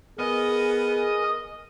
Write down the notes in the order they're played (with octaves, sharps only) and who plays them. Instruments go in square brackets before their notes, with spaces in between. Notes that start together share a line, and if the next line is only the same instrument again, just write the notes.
[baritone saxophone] B3 [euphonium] G#4 [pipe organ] A#4 G#5 [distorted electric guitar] D#5